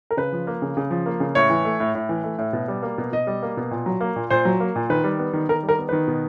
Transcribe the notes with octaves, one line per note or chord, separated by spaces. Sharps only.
A#4
C#3 B4
F3
A#3
C#3
C#3
F3
A#3
C#3
A2 C#5
E3
A3
A2
A2
E3
A3
A2
B2
G3
A#3
B2
B2 D#5
G3
A#3
B2
A#2
F#3
A#3
A#2
A#2 C5
F#3
A#3
A#2
D#3 B4
G3
B3
D#3
D#3 A#4
G3
A#4
B3
D#3 B4
B2